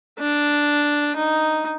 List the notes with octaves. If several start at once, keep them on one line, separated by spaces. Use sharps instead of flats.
D4
D#4